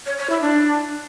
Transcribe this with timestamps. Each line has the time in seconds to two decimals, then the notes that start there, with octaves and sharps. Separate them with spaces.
0.06 C#5
0.18 C#5
0.30 E4
0.42 D4